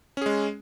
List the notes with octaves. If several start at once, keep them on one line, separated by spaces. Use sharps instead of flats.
G#3 C#4 G#4